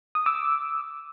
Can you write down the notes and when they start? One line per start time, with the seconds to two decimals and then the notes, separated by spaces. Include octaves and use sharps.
0.15 D#6
0.26 D6 E6